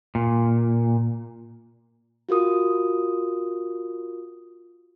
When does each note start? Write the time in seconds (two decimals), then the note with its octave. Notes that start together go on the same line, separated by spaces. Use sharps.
0.15 A#2
2.29 F4 F#4 A#4 D#6